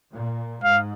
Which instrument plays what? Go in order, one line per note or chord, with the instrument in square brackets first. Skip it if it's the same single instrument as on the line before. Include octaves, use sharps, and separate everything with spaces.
[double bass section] A#2
[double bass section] G#2 [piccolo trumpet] F5